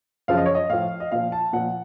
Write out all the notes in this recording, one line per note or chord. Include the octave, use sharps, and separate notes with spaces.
F#2 C#3 F3 F5
D#5
C#5
D#5
A2 F3 F5
D#5
A#2 F3 F5
A5
A#2 F3 F#5